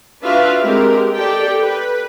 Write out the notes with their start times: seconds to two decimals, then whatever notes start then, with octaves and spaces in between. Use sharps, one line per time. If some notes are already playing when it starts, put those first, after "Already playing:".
0.22 D4 F4 F#4 B4 E5 F5
0.60 G#3 C4 G4 A#4
1.14 G4 A4 D5 G5
1.61 B4